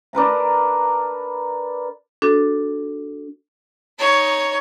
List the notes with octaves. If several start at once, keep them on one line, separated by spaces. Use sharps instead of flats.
D4 A#4 B4 A#5
D4 F#4 A4
D#4 C#5